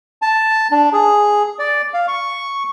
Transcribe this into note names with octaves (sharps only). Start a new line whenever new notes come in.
A5
D4
G#4
D5
F5
C#6